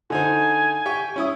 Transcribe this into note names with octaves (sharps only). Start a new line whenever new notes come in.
D3 D#4 C5 G#5
G4 G5 C#6
C#4 E4 D#6